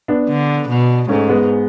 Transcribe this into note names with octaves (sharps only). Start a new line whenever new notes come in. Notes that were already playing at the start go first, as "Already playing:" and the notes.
B3 D4
D3
B2
G#2 A3 C#4
G#3 B3